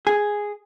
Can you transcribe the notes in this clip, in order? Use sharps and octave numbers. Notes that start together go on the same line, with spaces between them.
G#4